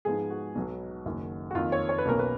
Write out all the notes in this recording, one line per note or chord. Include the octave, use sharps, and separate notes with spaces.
G#2 F3 B3 D#4 G#4
F#4
B1 B2 F#3 B3
F#1 F#2 D#3
F#4
F2 D#3 A#3 F4
C#5
C#5
B4
B1 B2 A#3 C#4 A#4
B4